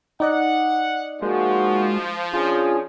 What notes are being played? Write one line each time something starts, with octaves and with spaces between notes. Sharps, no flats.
D#4 D5 D#5 F#5
F3 G#3 A#3 F#4
C#4 D4 F4 G#4